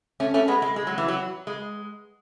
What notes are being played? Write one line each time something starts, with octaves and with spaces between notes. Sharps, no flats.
A3 C#4
A3 C#4
G#3 B3
G#3
G#3
F#3
E3
F#3
G#3